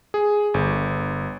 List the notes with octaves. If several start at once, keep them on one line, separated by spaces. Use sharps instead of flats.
G#4
G1